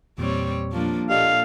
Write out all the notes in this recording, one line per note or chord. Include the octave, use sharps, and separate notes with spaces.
E2 A#2 G3 C4 C#5
F3 A#3 D4
A#2 G4 A4 D5 D#5 F5